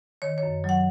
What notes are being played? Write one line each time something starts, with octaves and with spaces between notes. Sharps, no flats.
D#3 C#5
C#5
F#2
F#3 F#5